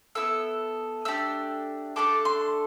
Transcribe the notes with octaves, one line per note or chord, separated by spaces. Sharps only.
B3 E4 A4 E6
A3 D4 G4 E6
A3 D4 A4 D6
C6